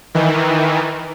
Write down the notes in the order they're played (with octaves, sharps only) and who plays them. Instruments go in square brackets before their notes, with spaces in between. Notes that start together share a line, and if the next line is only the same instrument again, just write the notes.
[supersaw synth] D#3 E3